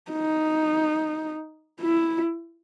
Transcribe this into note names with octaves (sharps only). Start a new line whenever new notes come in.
D#4
E4